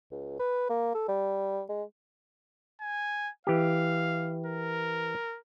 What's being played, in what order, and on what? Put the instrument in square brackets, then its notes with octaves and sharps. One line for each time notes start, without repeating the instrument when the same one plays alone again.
[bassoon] C#2
B4
A#3
A4
G3
G#3
[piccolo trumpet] G#5
[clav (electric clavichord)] E3 G4 [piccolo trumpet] F5
[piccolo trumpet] A#4